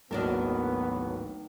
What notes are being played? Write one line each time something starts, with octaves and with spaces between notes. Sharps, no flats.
D1 G#1 D#3 F#3 A#3 B3 D4 A#4